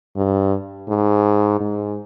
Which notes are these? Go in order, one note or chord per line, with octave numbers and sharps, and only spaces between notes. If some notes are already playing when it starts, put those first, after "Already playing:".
G2
G#2
G#2